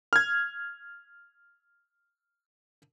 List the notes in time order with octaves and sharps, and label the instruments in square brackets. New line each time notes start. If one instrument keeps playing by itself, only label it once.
[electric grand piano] F6 G#6